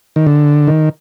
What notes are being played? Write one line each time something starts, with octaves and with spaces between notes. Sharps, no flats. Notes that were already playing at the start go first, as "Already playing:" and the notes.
D#3
D3
D#3